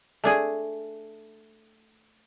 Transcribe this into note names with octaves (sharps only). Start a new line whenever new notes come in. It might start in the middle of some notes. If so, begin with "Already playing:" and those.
A3 D4 G#4